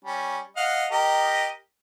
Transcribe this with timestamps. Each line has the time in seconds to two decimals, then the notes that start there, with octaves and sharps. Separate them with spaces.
0.05 G3 C#4
0.56 D#5 F5 F#5
0.91 G4 A#4 D#5